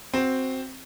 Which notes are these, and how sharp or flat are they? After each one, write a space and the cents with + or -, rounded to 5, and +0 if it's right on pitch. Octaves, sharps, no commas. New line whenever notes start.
C4 +0 F#4 +0